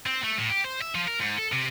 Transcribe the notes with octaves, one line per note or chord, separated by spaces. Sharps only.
C4
A3
A2
G4
C5
E5
F3
A#4
G#2
A4
C3